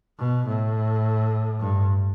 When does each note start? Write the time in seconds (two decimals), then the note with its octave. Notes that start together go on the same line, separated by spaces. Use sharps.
0.19 B2
0.47 A2
1.59 G2